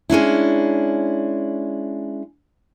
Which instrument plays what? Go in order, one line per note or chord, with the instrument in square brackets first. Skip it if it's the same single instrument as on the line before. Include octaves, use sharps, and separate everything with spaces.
[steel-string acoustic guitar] G#3 C#4 D4 E4